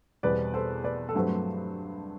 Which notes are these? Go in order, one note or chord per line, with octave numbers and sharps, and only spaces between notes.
E2 B2 G3 C4 B4 D5
A4 C5
B4 D5
A4
G2 F#3 A3 C4 B4
C5